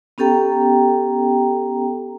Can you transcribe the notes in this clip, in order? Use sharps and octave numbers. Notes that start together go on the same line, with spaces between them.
B3 C#4 G4 A4 G5 A#5